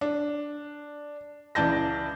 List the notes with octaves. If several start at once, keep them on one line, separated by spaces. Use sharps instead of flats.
D4
C#2 E3 D5 A5 G6 A#6